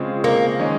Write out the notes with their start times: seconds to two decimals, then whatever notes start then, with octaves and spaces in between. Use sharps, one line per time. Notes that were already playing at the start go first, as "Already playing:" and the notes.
Already playing: C#3 G#3 C4 F4
0.24 A#3
0.59 D#3 G#3 C#4